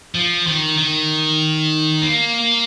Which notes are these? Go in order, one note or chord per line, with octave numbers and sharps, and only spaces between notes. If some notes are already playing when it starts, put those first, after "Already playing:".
F3
D#3
D#3
A#3